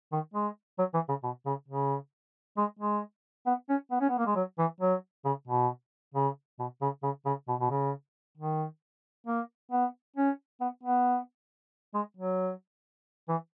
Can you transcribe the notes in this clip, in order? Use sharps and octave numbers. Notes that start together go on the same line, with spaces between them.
D#3
G#3
F#3
E3
C#3
B2
C#3
C#3
G#3
G#3
B3
C#4
B3
C#4
B3
A#3
G#3
F#3
E3
F#3
C#3
B2
C#3
B2
C#3
C#3
C#3
B2
B2
C#3
D#3
A#3
B3
C#4
B3
B3
G#3
F#3
E3